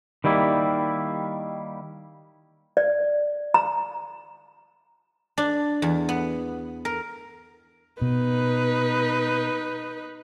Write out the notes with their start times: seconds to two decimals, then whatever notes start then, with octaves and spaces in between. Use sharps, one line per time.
0.24 D#3 G3 A#3 E4
2.77 D5
3.54 A#5
5.38 D4
5.82 E2
6.09 B3
6.85 A#4
8.02 B2 D#4 B4